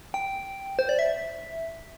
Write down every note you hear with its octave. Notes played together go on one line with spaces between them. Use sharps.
G5
C5
D5
E5